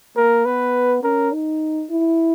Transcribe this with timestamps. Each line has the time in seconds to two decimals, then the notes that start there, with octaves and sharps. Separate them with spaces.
0.16 A#3 A#4
0.45 B3 B4
1.03 C#4 A#4
1.32 D#4
1.91 E4